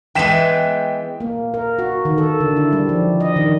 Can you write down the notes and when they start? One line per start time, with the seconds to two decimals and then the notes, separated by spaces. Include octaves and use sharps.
0.15 E3 G#3 B3 G5 B6 E7
1.20 A#3
1.54 A#4
1.79 F#4
2.05 D#3
2.18 A4
2.40 D3
2.56 E4
2.73 G3
2.89 F3
3.20 D#5
3.36 D#3